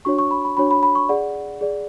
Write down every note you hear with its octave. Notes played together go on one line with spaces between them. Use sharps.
D4 F#4 C#5 C#6
C#6
B5
B5
D4 F#4 C#5 B5
B5
B5
C#6
G#4 D5 F#5
G#4 D5